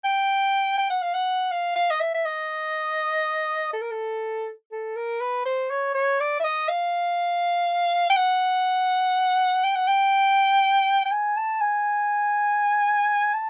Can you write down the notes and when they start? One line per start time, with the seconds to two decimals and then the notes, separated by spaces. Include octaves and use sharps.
0.04 G5
0.78 G5
0.90 F#5
1.02 F5
1.14 F#5
1.51 F5
1.76 F5
1.91 D#5
2.00 E5
2.14 E5
2.25 D#5
3.73 A4
3.82 A#4
3.91 A4
4.72 A4
4.96 A#4
5.21 B4
5.46 C5
5.71 C#5
5.95 C#5
6.20 D5
6.40 E5
6.44 D#5
6.69 F5
8.10 G5
8.16 F#5
9.64 G5
9.76 F#5
9.88 G5
11.05 G5
11.12 G#5
11.37 A5
11.61 G#5
13.34 A5